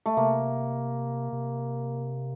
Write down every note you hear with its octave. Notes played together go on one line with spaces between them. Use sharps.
A3
C3 A#3
C3